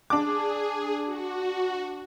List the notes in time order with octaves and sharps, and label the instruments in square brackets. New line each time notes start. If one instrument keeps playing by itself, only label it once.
[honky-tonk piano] D4 D6 [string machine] G#4
[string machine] F#4